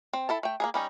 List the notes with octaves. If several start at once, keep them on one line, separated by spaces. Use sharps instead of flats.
C4
E4 A4 A5
A3 G5
A#3 D#4 G#4
G3 C#4 D#4